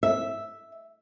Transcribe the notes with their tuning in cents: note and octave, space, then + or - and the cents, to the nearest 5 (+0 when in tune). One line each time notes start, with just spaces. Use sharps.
E5 +0